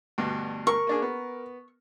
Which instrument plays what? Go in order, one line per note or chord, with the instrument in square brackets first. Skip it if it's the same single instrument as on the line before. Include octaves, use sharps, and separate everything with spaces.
[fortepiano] D2 G2 B2
[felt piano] A#4 [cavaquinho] C#6
[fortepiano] A#3 D4 G#4
B3